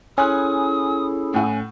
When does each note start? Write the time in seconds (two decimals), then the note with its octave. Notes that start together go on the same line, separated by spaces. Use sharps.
0.18 C#4 E4 G#4 A4 G#5 C6 D#6 F#6
1.34 A2 F#5 G#5